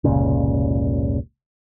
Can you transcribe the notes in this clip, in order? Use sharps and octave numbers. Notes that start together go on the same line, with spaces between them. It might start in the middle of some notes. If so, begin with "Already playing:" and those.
F1 C#2 A#2 C#3